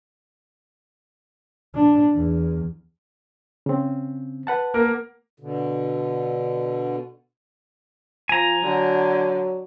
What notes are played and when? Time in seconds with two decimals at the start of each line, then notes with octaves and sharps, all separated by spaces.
1.75 D4
2.15 E2
3.66 C#3 C4
4.47 B4 F#5 A5
4.74 A#3 A#4
5.40 B2 D3
8.29 F3 G#5 A#5
8.64 D3 F#3